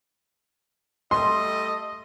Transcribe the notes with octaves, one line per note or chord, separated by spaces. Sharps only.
G3 A3 D#5 C6